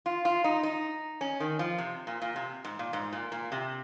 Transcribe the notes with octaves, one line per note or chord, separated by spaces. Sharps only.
F4
F4
D#4
D#4
C#4
D#3
F3
C3
A#2
A#2
C3
G#2
A#2
G#2
A#2
A#2
C3